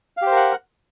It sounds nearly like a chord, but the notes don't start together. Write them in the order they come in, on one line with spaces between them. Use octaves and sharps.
F5 G4 C5 A#4 F#5